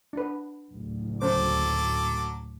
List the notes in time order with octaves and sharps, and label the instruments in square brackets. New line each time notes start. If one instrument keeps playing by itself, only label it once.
[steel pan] D4 B4
[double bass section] F#1 D2 A2
[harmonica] F#3 A4 D6 [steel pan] C#4 C5